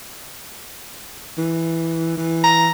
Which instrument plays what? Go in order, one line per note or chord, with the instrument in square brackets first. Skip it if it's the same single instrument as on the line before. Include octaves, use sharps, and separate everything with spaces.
[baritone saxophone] E3
E3
[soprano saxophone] A#5